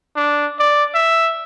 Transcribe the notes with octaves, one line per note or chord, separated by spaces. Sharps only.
D4
D5
E5